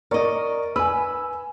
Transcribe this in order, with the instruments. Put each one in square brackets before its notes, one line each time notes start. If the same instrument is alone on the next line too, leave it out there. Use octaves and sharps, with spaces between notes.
[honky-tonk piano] A#4 C#6 [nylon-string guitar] D5 D#5
[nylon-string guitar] B4 [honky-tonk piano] G#5 E6